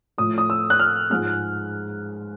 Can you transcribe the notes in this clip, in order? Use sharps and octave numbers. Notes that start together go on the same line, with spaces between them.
A2 F3 A3 D#6
D#6
E6
F#6
F6
G#2 F3 G#3 F6